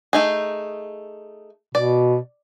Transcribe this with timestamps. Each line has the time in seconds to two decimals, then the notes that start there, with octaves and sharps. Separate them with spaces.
0.13 A3 D#4 G#4
1.75 B2 D5